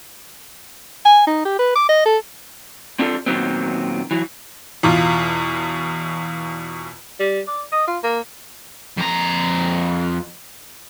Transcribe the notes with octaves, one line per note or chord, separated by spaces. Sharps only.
G#5
D#4
G4
B4
D6
D#5
A4
C4 D4 F4 A4
A#2 D#3 E3 F#3 B3 C4
E3 F#3
E2 B2 F4
G3
D5
D#5
F4
A#3
F2 A#5